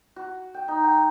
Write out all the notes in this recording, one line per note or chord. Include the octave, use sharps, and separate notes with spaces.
F#4
G5
D#4
G5